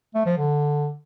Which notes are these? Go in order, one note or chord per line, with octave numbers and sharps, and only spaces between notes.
A3
F3
D3